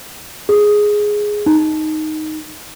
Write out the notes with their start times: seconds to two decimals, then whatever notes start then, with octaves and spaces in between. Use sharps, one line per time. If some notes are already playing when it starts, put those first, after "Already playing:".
0.49 G#4
1.46 D#4